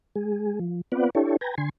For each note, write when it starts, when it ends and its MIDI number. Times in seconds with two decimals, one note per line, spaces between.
0.16 0.59 56
0.16 0.59 68
0.60 0.81 53
0.92 1.10 59
0.92 1.10 60
0.92 1.10 65
0.92 1.10 71
0.92 1.10 74
0.92 1.10 78
1.15 1.37 62
1.15 1.37 64
1.15 1.37 67
1.15 1.37 69
1.15 1.37 73
1.41 1.55 71
1.41 1.55 79
1.41 1.55 80
1.41 1.55 82
1.58 1.69 50
1.58 1.69 80
1.58 1.69 84